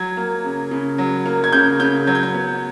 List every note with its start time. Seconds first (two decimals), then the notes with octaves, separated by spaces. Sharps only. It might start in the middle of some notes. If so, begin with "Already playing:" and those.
Already playing: F#3 G#6
0.17 A#3
0.44 C#3
0.71 C#3
0.98 F#3
1.25 A#3
1.44 G#6
1.53 C#3 G6
1.80 C#3 G6
2.07 F#3 G#6
2.15 G6
2.23 G#6
2.34 B3